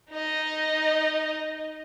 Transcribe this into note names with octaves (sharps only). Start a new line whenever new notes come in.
D#4 D#5